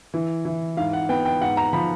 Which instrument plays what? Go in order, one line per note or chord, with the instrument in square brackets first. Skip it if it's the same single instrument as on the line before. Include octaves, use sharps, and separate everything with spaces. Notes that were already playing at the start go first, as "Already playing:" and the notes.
[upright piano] E3
E3
G#2 F5
F#5
B3 G5
G5
G#2 F#5
A#5
F3 B5